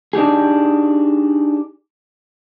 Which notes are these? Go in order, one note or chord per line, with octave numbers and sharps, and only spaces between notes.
D4 D#4 G4 G#4